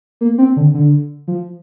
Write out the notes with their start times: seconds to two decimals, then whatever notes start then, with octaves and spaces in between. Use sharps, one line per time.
0.21 A#3
0.38 C4
0.56 D3
0.74 D3
1.28 F3